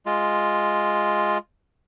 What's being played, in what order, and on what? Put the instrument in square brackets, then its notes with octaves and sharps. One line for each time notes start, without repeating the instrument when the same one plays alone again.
[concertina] G#3 F4